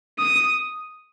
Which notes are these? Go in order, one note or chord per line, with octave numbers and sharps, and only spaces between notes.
D#6